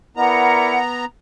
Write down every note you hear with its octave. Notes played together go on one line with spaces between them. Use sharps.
B3 E4 A#4 D5 F#5 A#5